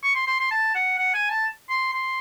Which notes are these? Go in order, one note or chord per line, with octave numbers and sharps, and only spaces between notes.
C#6
C6
C6
C6
A5
F#5
F#5
G#5
A5
C6
C6